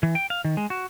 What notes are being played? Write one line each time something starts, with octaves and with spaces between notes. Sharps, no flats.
E3
G5
F5
D#3
G#3
F#4